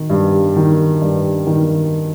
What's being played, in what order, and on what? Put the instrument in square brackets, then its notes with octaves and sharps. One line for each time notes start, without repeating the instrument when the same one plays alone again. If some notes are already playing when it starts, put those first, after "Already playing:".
Already playing: [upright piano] D#3
G2
D#3
G2
D#3